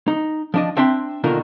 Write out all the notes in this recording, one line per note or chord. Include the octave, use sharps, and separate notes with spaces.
D#4
F3 D4 D#5
C4 D4 E5 G5 C6
B2 D3 D#3 A#3 F4 A#4